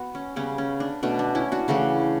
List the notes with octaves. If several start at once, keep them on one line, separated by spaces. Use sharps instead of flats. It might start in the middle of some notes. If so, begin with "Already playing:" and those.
Already playing: B3 F#4
C#4
C#3 G3 B3 C#4
C#4
D4
B2 A3 C#4 D4
D4
C#4 E4
D4 F#4
C#3 E3 A3 D4 F#4